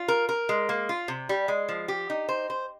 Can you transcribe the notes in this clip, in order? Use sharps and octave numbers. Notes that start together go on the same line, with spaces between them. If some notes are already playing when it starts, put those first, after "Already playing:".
Already playing: F4
A#4
A#4
G#3
A#3
F4
C3
G3
G#3
F3
G4
D#4
C5
C5